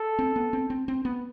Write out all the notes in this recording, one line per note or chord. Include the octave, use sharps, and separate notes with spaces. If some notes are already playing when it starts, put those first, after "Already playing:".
Already playing: A4
C4
B3
C4
C4
C4
B3